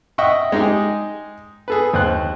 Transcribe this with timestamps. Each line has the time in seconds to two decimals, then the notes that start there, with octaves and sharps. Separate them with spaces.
0.18 D#5 E5 F#5 G5 C#6 E6
0.52 G#3 D#4 G4 G#4
1.68 G#4 A4 B4
1.94 D#2 C5 F#6